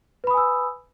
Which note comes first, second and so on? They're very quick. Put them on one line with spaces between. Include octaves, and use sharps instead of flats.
B4 B5 D#6 G#5 E6